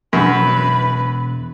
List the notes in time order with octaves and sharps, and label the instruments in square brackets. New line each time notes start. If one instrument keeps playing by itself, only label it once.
[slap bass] E1 [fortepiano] F#2 [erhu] B4